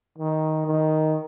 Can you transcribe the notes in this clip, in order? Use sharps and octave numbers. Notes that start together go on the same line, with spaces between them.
D#3
D#3